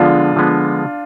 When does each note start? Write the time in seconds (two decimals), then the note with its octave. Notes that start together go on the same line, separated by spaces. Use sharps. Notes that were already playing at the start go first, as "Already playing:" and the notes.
Already playing: D3 F3 G#3 B3 D4 F4
0.36 D3 F3 G#3 B3